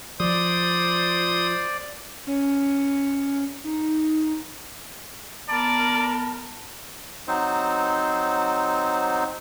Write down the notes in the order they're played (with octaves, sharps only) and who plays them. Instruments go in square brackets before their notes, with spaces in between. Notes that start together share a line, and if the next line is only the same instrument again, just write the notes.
[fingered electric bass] F3 [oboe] C5 [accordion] D5 [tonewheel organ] D#6
[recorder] C#4
D#4
[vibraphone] B3 B5 [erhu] A#4 [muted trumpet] D5 [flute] A5
[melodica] F#3 C4 D#4 C5